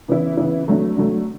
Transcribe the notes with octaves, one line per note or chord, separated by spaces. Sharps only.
C#3 E3 B3 E4
C#3 E3 B3 E4
D3 F#3 A3
D3 F#3 A3